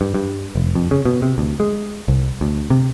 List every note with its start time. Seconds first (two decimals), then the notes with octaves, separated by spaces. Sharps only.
0.01 G2
0.14 G2
0.55 F1
0.75 F2
0.91 C#3
1.05 B2
1.22 C3
1.38 D2
1.60 G#3
2.08 C2
2.41 D2
2.70 C3